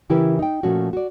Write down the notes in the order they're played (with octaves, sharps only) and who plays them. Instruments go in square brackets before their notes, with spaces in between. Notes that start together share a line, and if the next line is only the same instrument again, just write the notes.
[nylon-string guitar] C#3 E3 E4 G4 A#4 B4
D#4 G5
A#2 F3 A3 C#4 F#4
F#4 D5